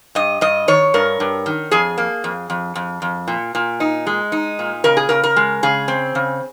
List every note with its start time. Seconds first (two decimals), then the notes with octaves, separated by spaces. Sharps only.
0.15 G2 D#5
0.41 G2 D#5
0.68 D#3 C#5
0.94 G2 A#4
1.20 G2
1.46 D#3
1.71 F2 G#4
1.98 A#3
2.24 F2
2.50 F2
2.75 F2
3.02 F2
3.28 A#2
3.55 A#2
3.80 D#4
4.07 G#3
4.32 D#4
4.59 A#2
4.84 C#3 A#4
4.97 G#4
5.09 C#3 A#4
5.24 A#4
5.36 G#3
5.63 C#3 G#4
5.88 C4
6.15 C#3